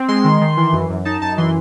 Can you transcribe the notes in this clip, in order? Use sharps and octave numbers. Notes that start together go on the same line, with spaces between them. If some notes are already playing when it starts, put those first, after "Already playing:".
Already playing: C4
G#3 C6
D#3
D#3
E3
F#2
F#2
D#4 A5
F#2 A5
E3 C6